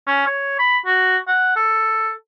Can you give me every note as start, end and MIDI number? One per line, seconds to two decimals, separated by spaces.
0.07 0.26 61
0.26 0.54 73
0.59 0.78 83
0.86 1.17 66
1.28 1.53 78
1.56 2.11 69